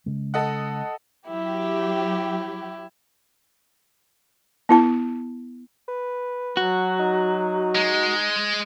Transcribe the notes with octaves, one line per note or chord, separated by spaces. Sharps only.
C#3 G#3
A4 D#5 F#5
F#3 E4 G4
B3 E4 A5
B4
F#3 F#4
D#4
G#3